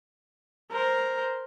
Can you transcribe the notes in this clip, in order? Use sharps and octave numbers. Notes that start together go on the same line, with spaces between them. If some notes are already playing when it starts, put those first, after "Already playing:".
A#4 C5